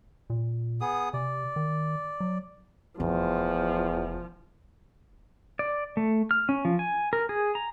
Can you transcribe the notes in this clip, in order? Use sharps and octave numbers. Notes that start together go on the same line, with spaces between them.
A#2
B3 G#4 D#6
C3 D5
D#3
F#3
F1 E2 F3
D5
A3
F6
C#4
F3
G#5
A#4
G#4
A#5